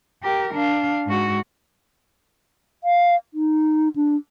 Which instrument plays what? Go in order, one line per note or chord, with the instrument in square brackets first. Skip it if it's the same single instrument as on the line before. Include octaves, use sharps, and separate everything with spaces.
[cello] G4 A#4
D4 F5
G#2 F#4
[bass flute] F5
D#4
D4